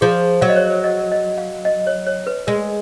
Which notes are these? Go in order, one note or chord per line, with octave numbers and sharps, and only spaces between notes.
F3 G#4
F#3 F5
D#5
C#5
D#5
D#5
F5
D#5
C#5
C#5
B4
G#3 A#4